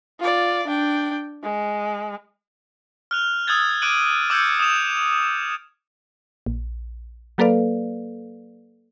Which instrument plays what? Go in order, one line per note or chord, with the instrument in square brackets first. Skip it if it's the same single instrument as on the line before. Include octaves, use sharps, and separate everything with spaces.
[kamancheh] F4 D5
D4 G5
G#3
[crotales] F6 F#6 F7
D#6 E6 F#6 G#6 A6
D6 F#6 D7 D#7 F#7
D6 E6 G6 G#6 C#7
D#6 E6 E7 F7
[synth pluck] A#1
F#3 A#3 A4 B4 D5 F5